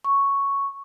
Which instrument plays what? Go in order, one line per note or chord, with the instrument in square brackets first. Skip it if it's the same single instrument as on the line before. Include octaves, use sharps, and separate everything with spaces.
[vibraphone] C#6